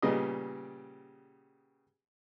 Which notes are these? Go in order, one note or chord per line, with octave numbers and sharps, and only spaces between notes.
A#2 C#3 G3 B3 D#5